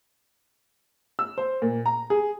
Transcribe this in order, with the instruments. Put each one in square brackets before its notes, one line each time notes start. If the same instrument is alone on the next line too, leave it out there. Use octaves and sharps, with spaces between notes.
[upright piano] E6
C5
A#2
A#5
G#4